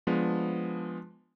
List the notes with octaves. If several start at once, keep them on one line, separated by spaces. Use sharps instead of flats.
F3 G#3 B3 D4